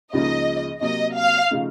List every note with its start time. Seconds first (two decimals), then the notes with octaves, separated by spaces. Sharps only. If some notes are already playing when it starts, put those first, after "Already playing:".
0.13 C#2 C#3 F3 A#3 D#4 D#5
0.81 C3 F#3 A#3 D#5
1.17 F5
1.50 C#3 F3 A3 D#4